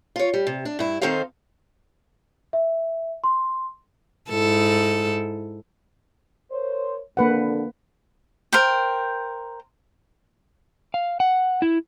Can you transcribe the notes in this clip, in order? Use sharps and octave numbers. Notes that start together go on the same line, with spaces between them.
F4 C#5
G3
C3
D4
G2 E4
D#3 C4 D#4 A4 C5 F5
E5
C6
G#2 E4 A4
A#4 C5 C#5
F2 D3 A#3 B4 F#5
A#4 C5 G5
F5
F#5
E4